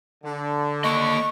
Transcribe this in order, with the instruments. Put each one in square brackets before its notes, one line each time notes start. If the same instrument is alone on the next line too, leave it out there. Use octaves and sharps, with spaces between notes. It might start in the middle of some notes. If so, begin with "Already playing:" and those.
[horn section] D3
[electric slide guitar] A#3 D#5 [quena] C#6